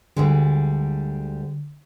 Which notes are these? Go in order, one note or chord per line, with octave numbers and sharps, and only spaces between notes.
D2 D3 G3 G#3